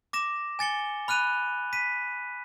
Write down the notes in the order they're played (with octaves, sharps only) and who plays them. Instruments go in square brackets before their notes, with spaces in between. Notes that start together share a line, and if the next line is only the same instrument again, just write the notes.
[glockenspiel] D6 A#6 E7
G#5 A6 C#7 G7
B5 F6 F#6 D#7 F7
B6 D#7